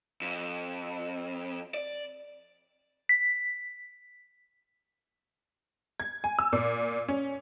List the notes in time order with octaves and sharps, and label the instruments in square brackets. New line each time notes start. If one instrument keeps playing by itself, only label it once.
[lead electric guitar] F2
D5
[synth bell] B6
[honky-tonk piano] G#6
G#5
E6
A#2
C#4